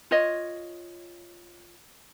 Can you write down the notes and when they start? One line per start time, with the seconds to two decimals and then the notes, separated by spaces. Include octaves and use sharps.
0.11 F4 C#5 D#5